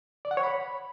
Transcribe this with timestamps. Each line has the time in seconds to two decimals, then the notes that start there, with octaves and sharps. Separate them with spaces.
0.25 D5
0.31 F#5
0.37 C#5
0.43 B5